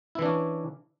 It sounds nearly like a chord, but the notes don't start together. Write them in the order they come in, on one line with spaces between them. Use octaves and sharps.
E4 E3 D4 C#4